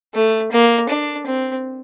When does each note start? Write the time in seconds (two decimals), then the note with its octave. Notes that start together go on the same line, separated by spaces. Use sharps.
0.14 A3
0.52 A#3
0.89 D4
1.27 C4